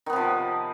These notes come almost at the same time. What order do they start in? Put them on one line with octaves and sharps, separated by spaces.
D#3 B3 C3 F3